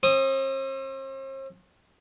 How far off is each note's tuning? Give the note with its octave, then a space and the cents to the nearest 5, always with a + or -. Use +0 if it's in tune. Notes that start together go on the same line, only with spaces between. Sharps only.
C4 +45 D#6 +0